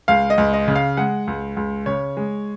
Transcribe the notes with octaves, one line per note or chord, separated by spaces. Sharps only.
C#2 F5
D#5
C#2
D#5
C#3
F5
G#3 F#5
C#2
C#2
C#3 C#5
G#3